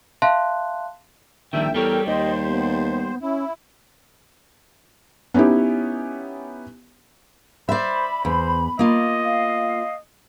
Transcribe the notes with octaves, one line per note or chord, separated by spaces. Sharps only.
E5 F5 A5 C6 F#6
A#1 D#3 G3 D4 E5 G5
E2 G3 G4 A4 A#4 C#5 G5
D#2 C5 D#5
B3
C#4 E4
B3 C#4 D#4 E4 G4
C5 D5 E5 B5
E2 C5
A#3 F4 D#5
F5